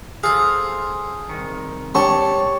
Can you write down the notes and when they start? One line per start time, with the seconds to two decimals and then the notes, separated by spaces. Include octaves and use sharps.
0.24 G#4 A4 C5 F5
1.29 C2 D#3
1.95 G3 C#5 A5 C#6